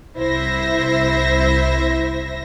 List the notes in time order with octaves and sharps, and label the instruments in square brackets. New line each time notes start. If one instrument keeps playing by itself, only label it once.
[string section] C2 E4 C5 E5 A#6